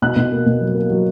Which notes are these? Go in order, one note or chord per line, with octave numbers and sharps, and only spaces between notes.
B2 F#6
B2
A#3
B2
F#3
A#3
F#3